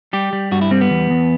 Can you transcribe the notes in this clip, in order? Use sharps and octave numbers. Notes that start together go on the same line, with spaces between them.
G3 G4
G3
G2 F#4
E4
G3 C4
B3
E2
E2